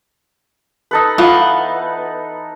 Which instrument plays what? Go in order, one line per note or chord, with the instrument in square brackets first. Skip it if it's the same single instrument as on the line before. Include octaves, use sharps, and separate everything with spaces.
[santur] D#4 A4 B4
[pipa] E3 B3 [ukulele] F4 F5